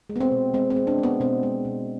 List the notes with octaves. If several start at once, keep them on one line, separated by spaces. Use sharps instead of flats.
G#3
B3
C4
B2
G#3 C4
C4
G#3
D4
G#3
B3
B2 C4
G#3
B2